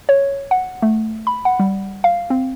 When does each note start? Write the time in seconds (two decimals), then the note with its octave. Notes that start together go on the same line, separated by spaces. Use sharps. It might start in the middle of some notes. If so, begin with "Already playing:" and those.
0.09 C#5
0.51 F#5
0.82 A3
1.27 B5
1.45 F#5
1.60 G3
2.04 F5
2.30 C4